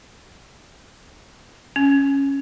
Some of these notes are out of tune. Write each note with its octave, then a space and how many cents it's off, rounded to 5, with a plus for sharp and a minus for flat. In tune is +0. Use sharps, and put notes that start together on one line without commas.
C#4 -5